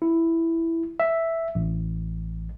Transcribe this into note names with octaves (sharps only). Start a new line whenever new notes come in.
E4
E5
A1